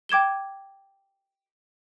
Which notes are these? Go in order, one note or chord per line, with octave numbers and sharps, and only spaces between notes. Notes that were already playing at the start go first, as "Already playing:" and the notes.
G5 D6 G#6 E7 G7